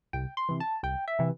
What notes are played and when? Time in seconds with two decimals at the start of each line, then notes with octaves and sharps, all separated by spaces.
0.13 C2 G5
0.37 C6
0.49 C3 E3
0.60 A5
0.83 C2 G5
1.08 E5
1.19 C3 E3